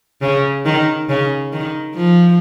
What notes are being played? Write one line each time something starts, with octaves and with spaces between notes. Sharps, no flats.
C#3
D#3
C#3
D#3
F3